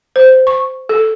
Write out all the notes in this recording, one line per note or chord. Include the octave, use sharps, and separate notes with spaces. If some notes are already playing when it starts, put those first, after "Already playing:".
C5
C#6
A4